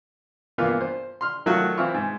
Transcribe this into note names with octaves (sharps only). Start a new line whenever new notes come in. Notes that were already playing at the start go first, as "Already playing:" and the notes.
G2 E3 A#3 B3 F4
C5
C6 F6
D#3 F#3 A3 F4 F#4
E3 C4 E4 F4 C#6 F6
G#2